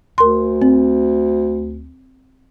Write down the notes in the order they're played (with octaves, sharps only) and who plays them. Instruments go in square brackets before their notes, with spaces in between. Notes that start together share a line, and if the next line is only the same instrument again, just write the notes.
[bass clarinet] D2 [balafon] A#4 C6
[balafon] C4